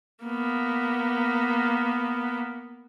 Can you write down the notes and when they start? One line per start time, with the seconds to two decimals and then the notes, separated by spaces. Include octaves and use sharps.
0.24 A#3 B3